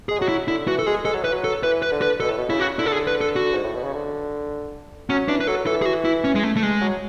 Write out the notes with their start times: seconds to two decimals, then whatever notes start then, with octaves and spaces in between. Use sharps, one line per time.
0.09 G#3 G#4
0.19 F#3 F#4
0.28 E4
0.48 D3 E4
0.67 E3 F#4
0.79 A4
0.86 G#3 G#4
1.05 G#3 A4
1.14 F#3
1.24 E3 B4
1.32 F#3
1.44 A4
1.63 E3 B4
1.82 B4
1.92 D3
2.02 B4
2.20 B2 A4
2.30 A2
2.38 B2
2.50 C#3 E4
2.60 F#4
2.78 D3 E4
2.86 A4
2.92 G#4
3.07 B4
3.21 A4
3.36 F#4
3.54 G#2
3.64 A2
3.75 B2
3.84 C#3
3.94 D3
5.09 F#3 C#4
5.28 E3 D4
5.40 B4
5.47 F#3 A4
5.67 E3 A4
5.82 G#4
5.86 F#4
6.05 E4
6.24 C#4
6.35 G#3
6.43 A3
6.57 A3
6.63 G#3
6.81 F#3